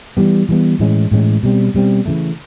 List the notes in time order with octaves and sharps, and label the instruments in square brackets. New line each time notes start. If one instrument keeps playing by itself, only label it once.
[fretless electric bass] E3 G3 B3
E3 G3 B3
A2 E3 G#3 C#4
A2 E3 G#3 C#4
B2 G3 C4
B2 G3 C4
C#3 E3 A3